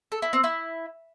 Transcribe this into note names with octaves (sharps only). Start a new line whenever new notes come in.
A4
E4
C4
E4